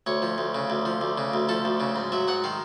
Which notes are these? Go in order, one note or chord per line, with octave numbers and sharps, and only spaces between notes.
D2 C#5
F3
D2
C#3
D2
F3
D2
C#3
D2
F3 A4
D2
C#3
G#2
F#3 E5
G#2 F#5
D#3 F5